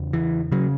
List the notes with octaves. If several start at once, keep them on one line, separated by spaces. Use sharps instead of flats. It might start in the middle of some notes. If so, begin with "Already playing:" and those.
Already playing: E2 C#3
E3
C#3 F#3